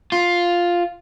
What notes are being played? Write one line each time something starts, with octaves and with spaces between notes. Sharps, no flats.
F4